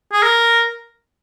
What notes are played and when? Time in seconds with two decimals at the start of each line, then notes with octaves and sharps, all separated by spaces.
0.13 G#4
0.23 A#4